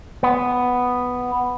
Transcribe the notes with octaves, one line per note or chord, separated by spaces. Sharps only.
B3